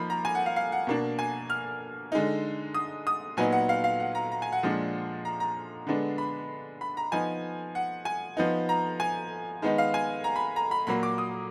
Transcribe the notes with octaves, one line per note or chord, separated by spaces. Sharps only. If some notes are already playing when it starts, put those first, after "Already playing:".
Already playing: F3 A#3 D#4 B5
A#5
G#5
F#5
F5
F5
F#5
B2 A#3 D4
G#5
F6
D3 G#3 D#4
D#6
D#6
A#2 F#3 B3 D#4 G#5
F#5
F5
F5
F#5
A#5
A#5
G#5
F#5
A#2 F3 G#3 D4
A#5
A#5
D3 G#3 B3 D4
B5
B5
A#5
F3 B3 D#4 G#5
F#5
G#5
F3 B3 D#4
A#5
G#5
D#3 G#3 B3 D#4
F5
G#5
A#5
B5
A#5
B5
A#2 F#3 A#3 B5
D6
D#6